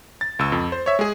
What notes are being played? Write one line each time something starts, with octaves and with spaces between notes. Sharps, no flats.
A6
C#2 E6
F2
C5
C#5 E5
G#3 G#4